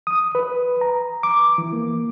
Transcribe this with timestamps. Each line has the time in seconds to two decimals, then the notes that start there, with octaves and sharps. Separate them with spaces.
0.07 D#6
0.35 B4
0.81 A#5
1.23 D6
1.58 E3
1.73 A#3